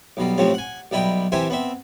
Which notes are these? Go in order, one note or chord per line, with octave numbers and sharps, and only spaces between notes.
B1 B2 G3
F2 A2 C3 F3 C4 C#4
F#5 G#5
B1 G3 E4 B4 D#5 G5
C3 E3 G4 C5 E5 G#5
B3 C4 E5